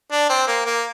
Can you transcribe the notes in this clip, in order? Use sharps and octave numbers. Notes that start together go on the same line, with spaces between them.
D4
C4
A#3
A#3